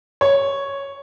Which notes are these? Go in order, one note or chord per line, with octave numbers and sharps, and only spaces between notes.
C#5